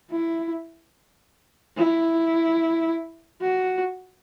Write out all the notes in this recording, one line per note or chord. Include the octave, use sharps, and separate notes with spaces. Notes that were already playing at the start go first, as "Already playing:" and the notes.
E4
E4
F#4